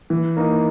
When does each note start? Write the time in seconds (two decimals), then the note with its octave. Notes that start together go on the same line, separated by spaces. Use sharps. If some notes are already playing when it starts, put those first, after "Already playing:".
0.10 E3
0.37 A#3 D#4